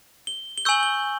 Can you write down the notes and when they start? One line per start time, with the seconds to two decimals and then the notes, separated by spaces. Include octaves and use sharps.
0.27 G7
0.58 G7
0.65 G#5 C#6 E6 G6 F#7
0.83 G7